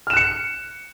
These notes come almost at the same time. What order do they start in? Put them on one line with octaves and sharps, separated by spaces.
F6 E7 F#6 C#7